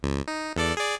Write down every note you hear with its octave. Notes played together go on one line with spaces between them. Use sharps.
C#2
D#4
E2 A4 D5
G#4 D5